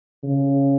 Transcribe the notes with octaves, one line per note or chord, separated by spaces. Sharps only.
C#3